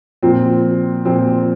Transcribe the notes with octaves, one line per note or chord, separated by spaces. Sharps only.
A#2 F3 C4
A#2 F3 C4